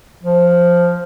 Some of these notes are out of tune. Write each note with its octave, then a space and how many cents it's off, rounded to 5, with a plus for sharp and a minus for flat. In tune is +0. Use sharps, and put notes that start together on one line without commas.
F3 +0